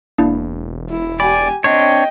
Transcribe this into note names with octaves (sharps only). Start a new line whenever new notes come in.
E1 A#3 D4 E4
E4
G4 D5 G#5 B5
C4 D4 C#5 D#5 G5